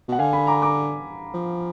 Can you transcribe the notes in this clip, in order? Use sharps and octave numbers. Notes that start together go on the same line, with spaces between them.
B2 F#5
D3 F5 G#5
G#5 B5
A#5 D6
A#5 D6
F3